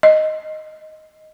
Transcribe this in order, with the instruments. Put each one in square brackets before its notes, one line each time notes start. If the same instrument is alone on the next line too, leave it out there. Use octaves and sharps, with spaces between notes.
[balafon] D#5